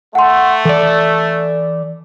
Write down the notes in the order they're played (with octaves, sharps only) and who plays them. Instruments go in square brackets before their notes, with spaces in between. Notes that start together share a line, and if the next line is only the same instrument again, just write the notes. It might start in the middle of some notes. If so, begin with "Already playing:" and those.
[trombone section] A3 [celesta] F#5 C6
[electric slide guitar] E3 D5 [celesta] A4